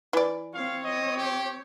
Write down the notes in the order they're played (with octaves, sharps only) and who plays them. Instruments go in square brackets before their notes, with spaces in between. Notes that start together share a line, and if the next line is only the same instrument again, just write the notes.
[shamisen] E3 D5
[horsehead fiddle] C4 C#5 [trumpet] F5
[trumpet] D#5
G4